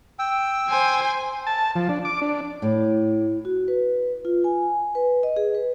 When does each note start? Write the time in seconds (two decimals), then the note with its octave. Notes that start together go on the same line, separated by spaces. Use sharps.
0.19 G5 E6
0.68 C5 G#5
1.47 A5
1.76 F3
1.89 D4
2.05 D6
2.22 D4
2.62 A2
3.45 F#4
3.68 B4
4.25 F4
4.44 G#5
4.95 B4
5.23 D#5
5.36 G#4
5.54 B4